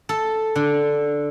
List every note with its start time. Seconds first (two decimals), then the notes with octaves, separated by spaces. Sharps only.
0.09 A4
0.56 D3